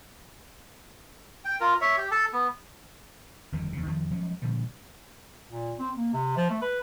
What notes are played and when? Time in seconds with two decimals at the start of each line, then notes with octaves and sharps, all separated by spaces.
1.45 G5
1.61 F4 A#4
1.81 C#5 E5
1.98 G4
2.11 A4 A5
2.33 B3
3.52 G1 F2 D#3
3.73 E2 C#3
3.86 F2 D#3 F3 C4
4.10 F3 F#3 G#3 C#4
4.42 A#2 D3 F3 G3
5.50 A#2
5.79 C4
5.95 A#3
6.13 C3
6.37 F3
6.50 A3
6.62 B4